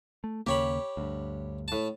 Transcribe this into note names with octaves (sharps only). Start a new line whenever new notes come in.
A3
D#2 C#3 A#3 G4 C#5 B5
D2 G2
A2 A5